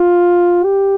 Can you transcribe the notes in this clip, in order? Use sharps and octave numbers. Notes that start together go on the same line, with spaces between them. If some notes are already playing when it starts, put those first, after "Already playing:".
Already playing: F4
G4